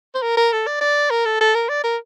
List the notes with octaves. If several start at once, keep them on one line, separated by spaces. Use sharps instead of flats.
C5
A#4
A#4
A4
D5
D5
A#4
A4
A4
A#4
D5
A#4